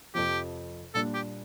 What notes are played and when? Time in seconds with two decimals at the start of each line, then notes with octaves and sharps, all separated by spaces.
0.15 F2 C3 F3 G4
0.94 A#2 G3 D4 A4
1.14 G4